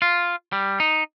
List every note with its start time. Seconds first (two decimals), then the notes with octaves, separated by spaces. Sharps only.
0.02 F4
0.53 G3
0.80 D#4